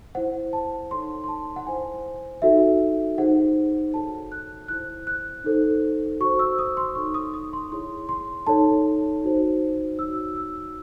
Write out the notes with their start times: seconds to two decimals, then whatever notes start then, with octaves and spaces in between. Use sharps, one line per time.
0.15 E4 C5 F#5
0.53 A5
0.91 D#4 A4 C#5 C6
1.24 C6
1.28 A5
1.56 F#5
1.67 E4 C5 G#5
2.42 D#4 F#4 A4 E5
3.18 D#4 G#4 C5 F#5
3.93 F#4 A4 C#5 A5
4.32 F#6
4.68 E4 C5 F#6
5.07 F#6
5.44 D#4 A4 C5
6.20 F#4 C#6
6.24 C5
6.39 E6
6.59 D#6
6.77 C6
6.95 D#4 A4 C#5 C#6
7.14 D#6
7.34 D#6
7.53 C6
7.72 E4 G#4 C#5 C6
8.09 C6
8.47 D#4 A4 C#5 A5
9.22 D#4 F#4 C5
9.98 D#4 F#4 C#5 E6
10.36 E6